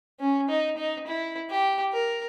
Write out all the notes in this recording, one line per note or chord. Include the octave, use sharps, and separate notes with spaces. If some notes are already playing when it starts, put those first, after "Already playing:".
C#4
D#4
D#4
E4
G4
A#4